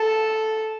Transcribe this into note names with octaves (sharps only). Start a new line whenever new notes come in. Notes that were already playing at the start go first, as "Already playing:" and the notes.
Already playing: A4